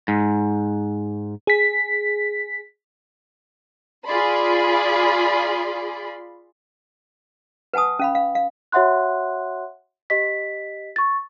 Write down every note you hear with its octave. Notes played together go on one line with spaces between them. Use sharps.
G#2
G#4 B6
F4 G#4 D5 B5 C6
B4 F#5 G#5 A5 D#6
C#4 F5 B5
F5
F5
F#4 C#5 E5 F#5 C6 F#6
G4 D#5 B6
C#6 A6